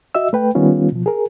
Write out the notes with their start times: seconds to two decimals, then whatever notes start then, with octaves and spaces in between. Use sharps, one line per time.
0.15 F#4 D#5 E5 E6
0.33 A3 B4 G5
0.55 D#3 G3 B3 C#4 F4
0.92 B2 F3
1.06 G#4 A#4